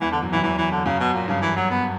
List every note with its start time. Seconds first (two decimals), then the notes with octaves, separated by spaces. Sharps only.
0.01 E2 E3
0.11 D3
0.23 F#2
0.32 E3
0.35 F#2
0.43 E2 E3
0.58 E3
0.72 D3
0.85 F#2 C#3
1.00 B2
1.14 A#2
1.28 G2 C#3
1.42 E3
1.56 F#3
1.70 B3